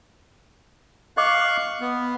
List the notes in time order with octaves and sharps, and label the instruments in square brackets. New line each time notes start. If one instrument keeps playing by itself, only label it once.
[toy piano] D#5 D6 [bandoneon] F5 C#6 F#6
[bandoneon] B3